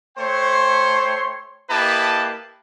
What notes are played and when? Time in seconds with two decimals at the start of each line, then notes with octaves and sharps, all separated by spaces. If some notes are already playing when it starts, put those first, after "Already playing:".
0.17 A3 C5 C#5 G5 C6
1.69 A#3 E4 G4 B4 D#5 A5